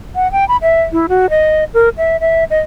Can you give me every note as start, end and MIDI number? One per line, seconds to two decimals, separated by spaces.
0.15 0.30 78
0.32 0.47 79
0.48 0.57 83
0.62 0.82 76
0.92 1.06 64
1.09 1.30 66
1.30 1.64 75
1.74 1.89 70
1.97 2.16 76
2.20 2.44 76
2.50 2.60 75